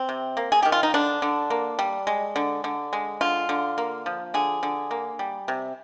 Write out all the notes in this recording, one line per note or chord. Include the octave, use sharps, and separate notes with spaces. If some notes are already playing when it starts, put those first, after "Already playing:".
Already playing: C4
C3
A#3
G#4
D#3 G4
F4
D#4
D3 D4
D3
A#3
G3
G#3
D3
D3
G#3
D3 F4
D3
A#3
F3
D3 G#4
D3
A#3
G3
C3